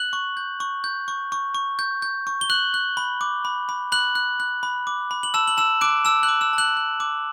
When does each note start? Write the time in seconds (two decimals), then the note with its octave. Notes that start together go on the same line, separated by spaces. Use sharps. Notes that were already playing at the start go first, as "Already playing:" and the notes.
Already playing: F#6 F#7
0.13 C#6
0.37 G6
0.60 C#6
0.84 G6
1.08 C#6
1.32 C#6
1.55 C#6
1.79 G6
2.02 G6
2.27 C#6
2.41 G7
2.50 F#6 F#7
2.74 F#6
2.97 B5
3.21 D6
3.45 B5
3.69 B5
3.92 B5 F#6 F#7
4.15 F#6
4.40 F#6
4.63 B5
4.87 D6
5.11 B5
5.23 F#7
5.34 A5 E6 E7
5.48 F#7
5.57 A5 E6 E7
5.81 D6 F#6 D7
6.05 A5 E6 E7
6.23 F#6 F#7
6.28 D6
6.41 E6 E7
6.53 A5
6.58 F#6 F#7
6.77 F#6
7.00 D6